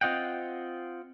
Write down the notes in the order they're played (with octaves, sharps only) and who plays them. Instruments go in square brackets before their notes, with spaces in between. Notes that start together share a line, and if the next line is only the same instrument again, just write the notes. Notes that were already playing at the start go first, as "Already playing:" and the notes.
[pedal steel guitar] C4 F4 D#5 F#5 G5